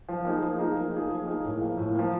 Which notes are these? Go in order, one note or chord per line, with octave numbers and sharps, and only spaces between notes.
F3
A#3 D#4 G#4
F3
A#3 D#4 G#4
F3
A#3 D#4 G#4
F3
A#3 D#4 G#4
A2
F3 A#3
A2
F3 A#3